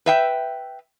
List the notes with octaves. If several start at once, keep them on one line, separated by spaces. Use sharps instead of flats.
B4 E5 G5